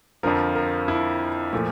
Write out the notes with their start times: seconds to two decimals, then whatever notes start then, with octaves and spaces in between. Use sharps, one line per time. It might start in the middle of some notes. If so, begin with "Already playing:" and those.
0.23 F2 D3 F3 A#4
0.55 A#4
0.88 E4
1.53 A#2 F3 A3